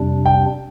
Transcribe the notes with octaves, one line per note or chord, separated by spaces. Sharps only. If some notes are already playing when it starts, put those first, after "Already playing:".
Already playing: F2 C3 G3 D4
G5